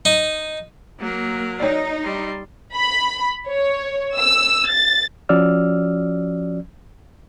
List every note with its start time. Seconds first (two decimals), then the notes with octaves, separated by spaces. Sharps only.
0.05 D#4
1.00 F#3 A#3 A#4
1.60 D#4 C#5 D5
2.03 G3 C6
2.76 B5
3.48 C#5
4.18 E6
4.70 A6
5.29 F3 C#4 F#4 D5 E6 F6